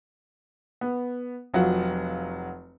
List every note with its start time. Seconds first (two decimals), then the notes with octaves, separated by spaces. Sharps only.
0.81 B3
1.54 F1 F#3 F4 F#5